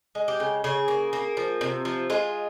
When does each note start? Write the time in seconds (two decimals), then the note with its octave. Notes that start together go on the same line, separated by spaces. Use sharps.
0.15 G#3
0.28 G4
0.40 C#3
0.64 C#3 G#4
0.88 A#3
1.13 A#3
1.37 F3
1.61 C3
1.85 F3
2.10 G#3 F4